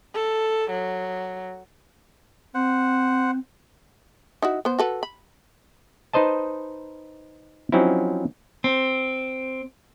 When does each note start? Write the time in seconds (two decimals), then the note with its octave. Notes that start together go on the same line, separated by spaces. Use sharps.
0.15 A4
0.70 F#3
2.54 C4 C5 F#5
4.42 D#4 E4 F#4
4.65 B3 C5
4.79 F#4 A4 B4
5.03 B5
6.13 D#4 B4 C5 D#5 A5
7.72 F3 F#3 C4 C#4 D#4 E4
8.64 C4